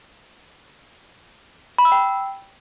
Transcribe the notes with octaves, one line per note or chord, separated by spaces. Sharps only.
B5
E6
G5